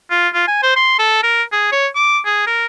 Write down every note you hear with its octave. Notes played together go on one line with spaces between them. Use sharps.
F4
F4
G#5
C5
C6
A4
A#4
G#4
C#5
D6
G#4
A#4